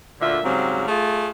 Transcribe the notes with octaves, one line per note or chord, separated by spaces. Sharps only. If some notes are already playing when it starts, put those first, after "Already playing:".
D2 A#2 D3 F4 E5
G#2 C#3 F#3 G3 C4
A3 F4 G#4